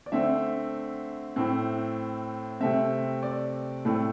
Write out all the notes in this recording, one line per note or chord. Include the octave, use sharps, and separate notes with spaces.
D5
D3 A3 C4 E5
A2 A3 C4
C3 A3 C4 E5
D5
A2 A3 C4